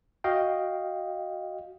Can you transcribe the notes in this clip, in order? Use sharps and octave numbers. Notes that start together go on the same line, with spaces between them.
F#4 D#5 F5 G5